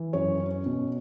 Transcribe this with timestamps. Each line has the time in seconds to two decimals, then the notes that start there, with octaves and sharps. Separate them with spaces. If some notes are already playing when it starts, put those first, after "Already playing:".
Already playing: E3
0.13 F#2 C#5
0.40 C#4
0.66 B2